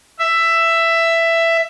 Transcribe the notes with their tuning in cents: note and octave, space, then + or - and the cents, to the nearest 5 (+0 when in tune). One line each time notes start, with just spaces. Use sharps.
E5 +10